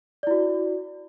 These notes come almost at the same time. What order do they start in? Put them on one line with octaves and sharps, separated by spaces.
D5 E4 F#4